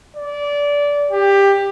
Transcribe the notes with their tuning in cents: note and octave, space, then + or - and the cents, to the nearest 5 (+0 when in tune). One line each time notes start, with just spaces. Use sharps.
D5 -20
G4 +15